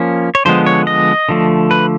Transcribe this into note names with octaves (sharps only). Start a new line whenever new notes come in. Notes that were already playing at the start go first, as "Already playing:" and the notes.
Already playing: F3 A#3 C#4
C#5
D3 F3 G#3 B3 C5
C#5
D#5
D3 F3 A3
B4